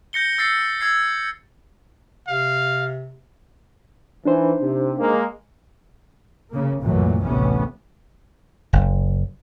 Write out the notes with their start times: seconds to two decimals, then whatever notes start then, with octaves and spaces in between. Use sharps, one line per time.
0.13 G6 A#6 C#7 G7
0.38 E6 A6 C7 C#7
0.81 E6 G#6 C7
2.28 C3 F5
4.25 E3 D4 D#4 C5
4.61 C3
4.98 G#3 A#3
6.50 C#3 A#3
6.82 C2 F#2 A#2 E3 F#3 A3
7.23 A1 D2 C3 E3 B3 C#4
8.73 F#1